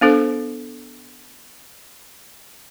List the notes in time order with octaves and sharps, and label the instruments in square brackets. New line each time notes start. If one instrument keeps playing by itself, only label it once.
[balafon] B3 D4 A4 C5